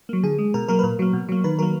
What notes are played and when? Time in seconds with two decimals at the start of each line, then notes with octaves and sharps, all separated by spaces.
0.09 F#3 A#3
0.23 D3 G#4
0.38 G#3
0.54 B2 A#4
0.68 F#3 A#3 A#4
0.79 B4
0.83 A#2 A#4
0.99 F#3 A#3
1.13 B2
1.29 F#3 A#3
1.44 D#3 B4
1.59 F#3 A#3 A#4